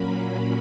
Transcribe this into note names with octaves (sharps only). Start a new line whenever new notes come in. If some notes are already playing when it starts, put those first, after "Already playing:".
Already playing: A#2 F#3 A#3 C#4 B5